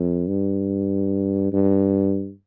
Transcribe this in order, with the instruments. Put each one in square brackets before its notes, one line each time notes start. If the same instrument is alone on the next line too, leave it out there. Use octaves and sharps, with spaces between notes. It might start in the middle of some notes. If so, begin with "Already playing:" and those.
Already playing: [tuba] F2
G2
G2